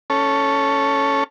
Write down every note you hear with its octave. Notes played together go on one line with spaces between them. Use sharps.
C#4 A4